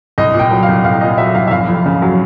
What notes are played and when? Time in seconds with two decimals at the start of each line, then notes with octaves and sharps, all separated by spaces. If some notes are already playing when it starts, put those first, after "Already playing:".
0.18 C2 D#5
0.34 A#2
0.39 G5
0.51 F#3
0.63 F5
0.68 C2
0.84 C2 F5
1.01 A#2 D#5
1.18 F#3 E5
1.34 C2 F5
1.47 E5
1.51 F1 F5
1.68 F2
1.86 C#3
2.02 F#3